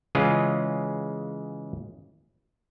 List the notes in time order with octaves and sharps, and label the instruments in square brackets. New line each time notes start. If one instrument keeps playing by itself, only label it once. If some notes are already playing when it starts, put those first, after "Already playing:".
[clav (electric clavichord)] C#3 E3 G#3 C#4 F4 G#4